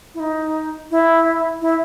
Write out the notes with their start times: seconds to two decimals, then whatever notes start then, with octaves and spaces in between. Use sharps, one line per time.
0.15 E4
0.20 D#4
0.91 E4
1.61 E4